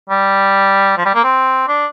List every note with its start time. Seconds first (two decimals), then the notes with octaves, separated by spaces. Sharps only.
0.09 G3
0.97 F3
1.05 G3
1.15 A#3
1.24 C4
1.68 D4